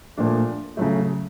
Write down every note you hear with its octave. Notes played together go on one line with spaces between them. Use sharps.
A#2 F3 A3 D4
C#3 F#3 A3